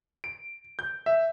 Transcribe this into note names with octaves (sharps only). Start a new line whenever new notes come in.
D7
G6
E5